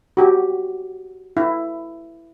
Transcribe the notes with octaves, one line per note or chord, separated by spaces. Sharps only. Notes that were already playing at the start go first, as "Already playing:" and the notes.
F#4 G4
E4